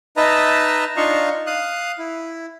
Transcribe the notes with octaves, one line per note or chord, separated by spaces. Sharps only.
D#4 B4 D#5 E5 A5 A#5
D4 D#4 F4 D#5 F5 C#6
F5 D#6 F#6
E4